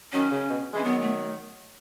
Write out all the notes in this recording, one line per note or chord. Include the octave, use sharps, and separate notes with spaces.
D#3 F#3 C#4
C#3
B2
E3 G#3
C#4
D#3 F#3 B3
A3